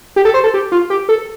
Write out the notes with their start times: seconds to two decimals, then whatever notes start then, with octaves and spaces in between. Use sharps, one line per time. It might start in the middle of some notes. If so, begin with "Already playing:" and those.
0.16 G4
0.25 A4
0.34 C5
0.44 A4
0.54 G4
0.72 F4
0.90 G4
1.09 A4